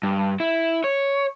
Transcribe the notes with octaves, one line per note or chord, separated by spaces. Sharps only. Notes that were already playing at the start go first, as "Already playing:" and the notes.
G2
E4
C#5